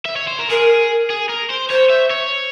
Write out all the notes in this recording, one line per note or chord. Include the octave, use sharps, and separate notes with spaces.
E5
C#5
C5
A#4
G#4 A#4
G#4
A#4
C5
C5 C#5
E5
C#5